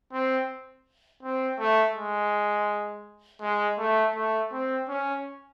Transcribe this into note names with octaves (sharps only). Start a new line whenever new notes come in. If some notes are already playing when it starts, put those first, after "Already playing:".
C4
C4
A3
G#3
G#3
A3
A3
C4
C#4